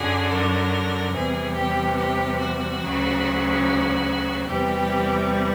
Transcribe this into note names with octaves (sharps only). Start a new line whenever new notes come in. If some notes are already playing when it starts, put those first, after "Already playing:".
Already playing: F#2 D3 F#3 G#4
A#4
E2 C3 E3 G3 G#4
G4
G4
F#4
D2 C#3 F#3
F#4
E2 C3 E3 G3 G4